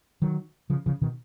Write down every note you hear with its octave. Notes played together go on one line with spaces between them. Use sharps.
D#3 F#3
C#3 F3
C#3 F3
B2 D#3